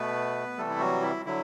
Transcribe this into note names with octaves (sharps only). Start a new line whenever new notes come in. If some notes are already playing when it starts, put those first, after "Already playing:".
Already playing: B2 A3 B3 B4
C3 E3 G3 A3 A4
E4
F#3 F#4
E4
D3 F#3 E4